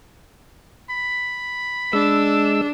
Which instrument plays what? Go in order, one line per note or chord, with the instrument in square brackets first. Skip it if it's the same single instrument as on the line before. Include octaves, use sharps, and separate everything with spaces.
[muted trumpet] B5
[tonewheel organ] G#3 E6 [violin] D4